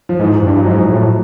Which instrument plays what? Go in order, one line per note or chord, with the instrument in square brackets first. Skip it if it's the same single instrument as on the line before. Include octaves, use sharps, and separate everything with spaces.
[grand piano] F3
[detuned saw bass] G#2 [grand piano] E3
[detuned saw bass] G2
[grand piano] F#3
[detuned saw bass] G#2 [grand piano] F3
[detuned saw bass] A2